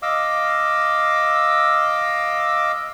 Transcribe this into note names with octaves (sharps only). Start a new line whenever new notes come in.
D#5 F5 D6 E6